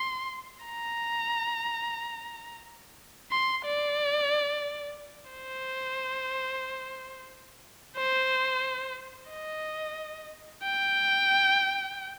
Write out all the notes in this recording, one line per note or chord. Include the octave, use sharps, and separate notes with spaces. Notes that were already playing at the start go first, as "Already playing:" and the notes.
Already playing: C6
A#5
C6
D5
C5
C5
D#5
G5